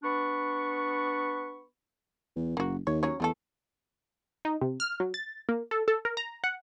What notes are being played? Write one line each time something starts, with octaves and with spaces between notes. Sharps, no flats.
B3 D4 B5 C#6
E2
F#1 A#3 F#4
D#2 C#5
F#3 C#4 C#5
E2 G3 A3 A4
D#4
C3
F6
F#3
A6
A#3
A4
A4
A#4
A#5
F#5